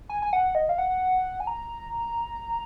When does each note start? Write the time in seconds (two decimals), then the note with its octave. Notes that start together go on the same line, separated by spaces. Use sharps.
0.09 G#5
0.22 G#5
0.33 F#5
0.55 D#5
0.69 F5
0.78 F#5
1.40 G#5
1.47 A#5